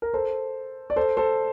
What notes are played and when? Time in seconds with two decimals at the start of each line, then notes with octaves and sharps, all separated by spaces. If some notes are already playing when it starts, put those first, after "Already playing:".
0.02 A#4
0.14 A4 C5
0.90 D5
0.96 A4 C5
1.17 A4 C5